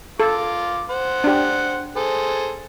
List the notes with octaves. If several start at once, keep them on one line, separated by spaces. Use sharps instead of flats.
F4 A4 F5 D6
C5 F#5
D4 G4
G#4 A4 C5